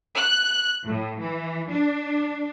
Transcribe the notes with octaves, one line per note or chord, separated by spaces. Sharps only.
F#6
A2
E3
D4